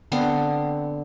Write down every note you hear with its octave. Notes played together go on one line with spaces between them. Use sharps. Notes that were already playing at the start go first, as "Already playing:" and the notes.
D3 B3 C4 F5